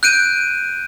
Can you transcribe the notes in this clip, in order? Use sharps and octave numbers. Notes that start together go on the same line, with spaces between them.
F#6 G6 D7 D#7